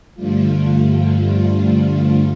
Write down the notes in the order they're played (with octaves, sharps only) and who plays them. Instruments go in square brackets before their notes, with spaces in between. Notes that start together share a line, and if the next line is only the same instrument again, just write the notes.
[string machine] G2 D3 F3 G3 A3 F4